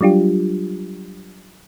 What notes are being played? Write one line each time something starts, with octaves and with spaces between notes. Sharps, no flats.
F#3 G3 D4 F4 G4